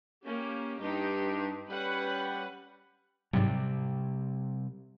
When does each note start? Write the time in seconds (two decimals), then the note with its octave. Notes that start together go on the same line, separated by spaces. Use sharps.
0.25 A#3 C#4 G4
0.80 G2 D#4 G4
1.69 G3 C#4 B4 F#5
3.33 G#2 C3 F#3 G3